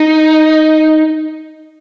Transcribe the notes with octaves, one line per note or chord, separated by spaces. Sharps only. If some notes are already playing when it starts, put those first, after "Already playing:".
Already playing: D#4